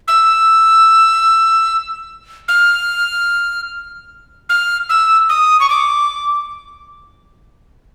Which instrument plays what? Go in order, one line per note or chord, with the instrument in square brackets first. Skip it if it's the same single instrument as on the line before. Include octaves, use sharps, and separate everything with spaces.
[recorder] E6
F6
F6
E6
D#6
C#6
D6